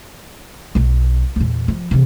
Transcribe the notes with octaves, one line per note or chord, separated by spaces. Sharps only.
B1 B2
E2 A#2
F3
C3 E3